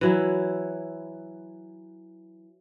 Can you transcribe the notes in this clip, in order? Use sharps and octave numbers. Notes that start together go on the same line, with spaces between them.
E3 F#3 E4